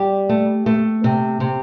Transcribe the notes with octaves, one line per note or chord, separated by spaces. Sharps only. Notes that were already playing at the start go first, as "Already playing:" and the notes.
Already playing: G3 G4
A3
A3
C3
C3